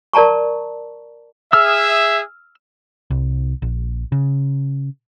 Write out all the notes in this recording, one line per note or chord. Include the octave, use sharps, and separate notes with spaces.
A#4 D5 A5 A#5 C#6
G#4 E5 E6 F6
C2
A#1
C#3